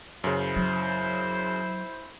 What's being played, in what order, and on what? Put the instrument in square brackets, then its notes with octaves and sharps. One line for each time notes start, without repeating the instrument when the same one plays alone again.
[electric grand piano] F#2 C#3 [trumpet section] E4 C5
[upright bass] F#3